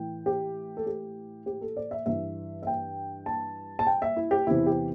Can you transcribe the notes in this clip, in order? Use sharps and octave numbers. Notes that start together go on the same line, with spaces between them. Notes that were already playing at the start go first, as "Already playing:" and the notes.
Already playing: A2 E3 G5
G4
A4
G4
G4
A4
D5
E5
G2 E3 E5
E5
G5
A5
A5
G5
E5
E4
G4
E2 C3 E3 E4
G4